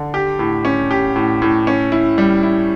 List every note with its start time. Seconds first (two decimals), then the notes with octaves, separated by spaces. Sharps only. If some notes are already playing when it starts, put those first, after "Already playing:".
Already playing: D3
0.14 G4
0.39 A2
0.65 C#4
0.91 G4
1.16 A2
1.42 A2
1.67 C#4
1.92 E4
2.18 G3
2.43 E4